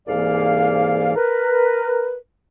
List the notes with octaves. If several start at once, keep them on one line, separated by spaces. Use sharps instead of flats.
C2 G#2 E3 A#3 D5 F5
A#4 B4